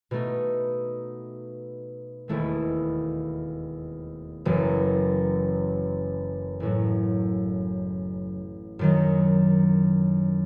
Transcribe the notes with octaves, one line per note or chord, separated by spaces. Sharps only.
B2 A3 D#4
E1 D#2 D#3 A3 E4
F#1 F#2 E3
A1 A2 F#3 A3
F#2 D#3 F#3